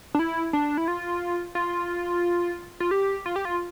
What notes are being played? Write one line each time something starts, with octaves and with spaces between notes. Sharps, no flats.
D4
E4
D4
E4
F4
F4
F4
G4
F4
G4
F4